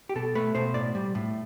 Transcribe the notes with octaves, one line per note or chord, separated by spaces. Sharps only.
G4
B2 A4
A3 B4
B2 C5
A2 D5
G3
A2